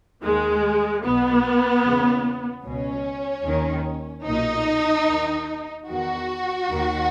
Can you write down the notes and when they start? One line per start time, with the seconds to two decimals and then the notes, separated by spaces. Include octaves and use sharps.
0.23 D#2 D#3 G#3
1.03 B1 B2 B3
1.84 E2 C#3 E3
2.65 C#2 B2 C#4
3.46 D#2 D#3
4.26 B1 A#2 D#4
5.07 D#2 D#3
5.88 E2 D#3 F#4
6.70 D#2 D#3